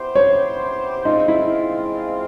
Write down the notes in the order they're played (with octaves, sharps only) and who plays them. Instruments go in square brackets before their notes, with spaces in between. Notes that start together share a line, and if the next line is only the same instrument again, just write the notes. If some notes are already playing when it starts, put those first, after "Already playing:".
Already playing: [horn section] B3 E4 G4 C5
[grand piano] C#5
[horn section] G#3 C4 F4 [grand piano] D#4
[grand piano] E4